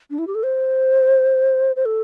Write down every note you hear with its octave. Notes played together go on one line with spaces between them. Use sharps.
D4
E4
G4
A4
C5
C5
A4